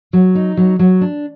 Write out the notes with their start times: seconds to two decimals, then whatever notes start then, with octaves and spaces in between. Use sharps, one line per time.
0.13 F#3
0.35 D#4
0.57 F#3
0.79 F#3
1.01 D4